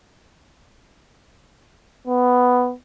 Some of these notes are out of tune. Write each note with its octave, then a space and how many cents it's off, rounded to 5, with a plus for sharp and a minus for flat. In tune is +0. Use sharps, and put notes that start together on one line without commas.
B3 +5